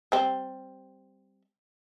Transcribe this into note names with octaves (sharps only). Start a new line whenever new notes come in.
G3 C4